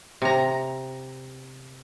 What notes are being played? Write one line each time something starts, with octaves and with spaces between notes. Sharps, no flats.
C3 A#5